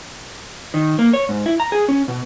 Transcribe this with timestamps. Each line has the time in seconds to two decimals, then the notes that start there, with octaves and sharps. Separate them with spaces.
0.74 D#3
0.99 A#3
1.13 C#5
1.29 G#2
1.46 E4
1.60 A#5
1.72 G#4
1.88 C#4
2.08 B2